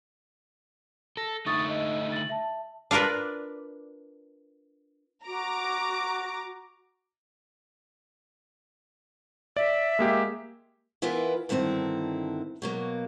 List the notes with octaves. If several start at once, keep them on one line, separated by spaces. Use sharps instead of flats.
A4 A#6
D3 A3 D#4 C#6 D#6 A6
D#5
A6 F#7
E5 A5
D4 F4 A#4 B4 D5
F#4 A#5 D6
D5 E5
G#3 A#3 G4
E3 B3 E4 F4 A#4 B4
G2 D3 D#3 C4 E4
B2 F#3 A#3